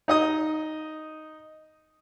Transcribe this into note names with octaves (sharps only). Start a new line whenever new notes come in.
D#4 D#5 D#6